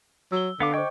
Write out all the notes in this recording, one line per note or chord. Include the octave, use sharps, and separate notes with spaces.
F#3 E6 G7
D3 B3 F5 D6
C5 D#5 G5 C#6 D6